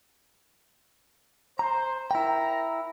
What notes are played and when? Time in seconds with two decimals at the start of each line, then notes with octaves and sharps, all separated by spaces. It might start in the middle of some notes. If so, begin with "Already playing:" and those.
1.59 C5 A#5
2.11 E4 A#4 G5 A#5